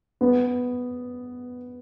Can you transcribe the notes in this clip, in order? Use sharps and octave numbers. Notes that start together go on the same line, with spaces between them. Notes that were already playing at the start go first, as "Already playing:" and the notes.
B3